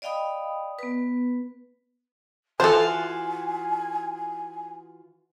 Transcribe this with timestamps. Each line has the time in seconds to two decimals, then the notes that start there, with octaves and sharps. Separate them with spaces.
0.02 D5 D#5 F5 G5 B5 D#6
0.79 B3 B4
2.60 E3 F4 F#4 A4 C5 G#5